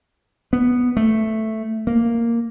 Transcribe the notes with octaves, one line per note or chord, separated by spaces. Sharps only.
B3
A3
A#3